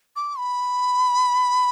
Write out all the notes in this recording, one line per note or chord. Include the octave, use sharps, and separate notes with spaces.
D6
B5